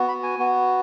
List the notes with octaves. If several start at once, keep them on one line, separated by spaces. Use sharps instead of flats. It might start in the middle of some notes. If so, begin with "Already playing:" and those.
Already playing: B3 F#4
B5
G#5
B3 F#4